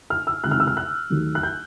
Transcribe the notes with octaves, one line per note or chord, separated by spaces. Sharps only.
F6
E6
C#2 C3 D#3 F#6
F6
E6
F6
F#6
D#2 D#3 F#3 A3
F#6
G6